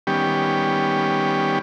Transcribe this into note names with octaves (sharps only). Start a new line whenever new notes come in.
D#3 G3 B3 C#4 G4